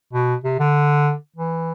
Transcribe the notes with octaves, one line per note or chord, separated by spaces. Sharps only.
B2
C3
D3
E3